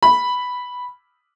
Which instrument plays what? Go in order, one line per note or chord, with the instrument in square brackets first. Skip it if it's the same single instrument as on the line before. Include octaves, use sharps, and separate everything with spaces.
[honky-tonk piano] B5